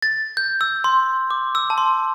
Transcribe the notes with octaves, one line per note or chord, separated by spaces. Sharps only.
A6
G6
E6
C6
D6
E6
A5
C6